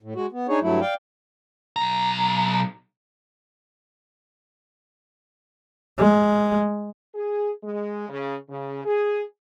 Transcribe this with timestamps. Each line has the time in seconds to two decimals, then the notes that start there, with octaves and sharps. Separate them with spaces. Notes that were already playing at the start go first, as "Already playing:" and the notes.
0.03 A2
0.15 G#3 F#4
0.32 B3
0.49 D4 D#4 G#4 C#5
0.61 G2 F#3 A3 E4
0.81 D5 F5 G5
1.76 B1 A#5
5.98 G#3
7.15 G#4
7.63 G#3
8.09 C#3
8.50 C#3
8.85 G#4